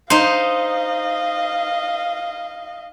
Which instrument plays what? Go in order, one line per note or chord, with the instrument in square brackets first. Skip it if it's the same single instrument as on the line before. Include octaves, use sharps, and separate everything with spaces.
[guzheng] D#4 C5 [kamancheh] D#5 F5